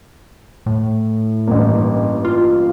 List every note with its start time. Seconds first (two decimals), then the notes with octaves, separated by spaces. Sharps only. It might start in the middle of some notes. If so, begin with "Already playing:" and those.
0.66 A2
1.47 A1 G2 A#3
2.25 F4